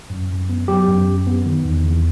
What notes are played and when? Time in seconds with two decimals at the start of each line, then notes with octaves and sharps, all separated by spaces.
0.10 F#2
0.30 F#2
0.50 B3
0.68 F#3 G4
0.88 F#2
1.07 F#2
1.27 B3
1.46 D#3
1.65 E2
1.85 E2